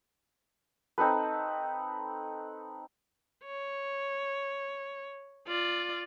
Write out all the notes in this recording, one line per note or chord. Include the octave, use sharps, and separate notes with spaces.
C4 D#4 A4 B4
C#5
F4 D5